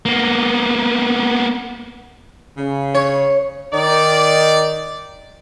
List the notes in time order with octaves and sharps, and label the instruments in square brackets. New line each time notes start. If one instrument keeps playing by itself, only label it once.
[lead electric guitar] A#3 B3
[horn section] C#3
[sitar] C#5
[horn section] D#3 D#4 D5